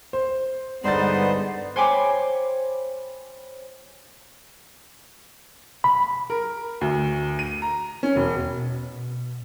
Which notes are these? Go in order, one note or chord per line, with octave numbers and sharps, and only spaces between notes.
C5
G2 D3 G#3 B3 D#4 C5 D5 A6
C5 C#5 G5 G#5 B5 D6
B5
A#4
D2
D#7
A#5
C#4
E1
B2